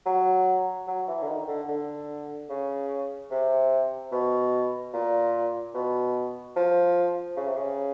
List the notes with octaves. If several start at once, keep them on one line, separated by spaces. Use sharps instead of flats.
F#3
F#3
E3
D3
D#3
D3
D3
C#3
C3
B2
A#2
B2
F3
C#3
C3
C#3